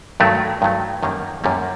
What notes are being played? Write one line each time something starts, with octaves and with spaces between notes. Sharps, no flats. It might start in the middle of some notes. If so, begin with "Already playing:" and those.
G2 D#3 F#3 A3
G2 D#3 F#3 A3
F#2 D#3 G3 A#3
F#2 D#3 G3 A#3